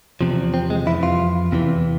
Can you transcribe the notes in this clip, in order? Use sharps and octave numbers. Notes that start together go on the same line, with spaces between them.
E2 C3 F3
C4
G#3
F2 E3 E4
F4
E2 C3 E3